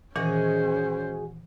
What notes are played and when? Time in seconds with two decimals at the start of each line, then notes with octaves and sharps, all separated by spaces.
0.16 A#2 D#3 E3 G#3 C#4 F#4 G#4 C5